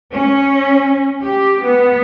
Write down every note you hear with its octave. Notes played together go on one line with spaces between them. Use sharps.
C#4
G4
B3